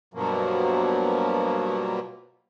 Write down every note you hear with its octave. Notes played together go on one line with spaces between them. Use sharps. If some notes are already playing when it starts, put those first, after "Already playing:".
G2 B2 F3 F#3 A#3